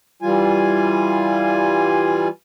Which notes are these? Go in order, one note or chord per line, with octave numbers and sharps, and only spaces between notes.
E3 G3 F4 G#5